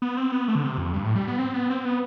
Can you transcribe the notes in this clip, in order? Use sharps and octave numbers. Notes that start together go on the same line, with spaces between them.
B3
C4
B3
A3
D3
C3
F2
G2
A2
G3
B3
C4
B3
C4
B3